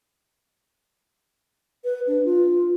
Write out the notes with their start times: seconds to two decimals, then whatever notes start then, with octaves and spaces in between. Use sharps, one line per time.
1.84 B4
2.07 D4
2.25 F4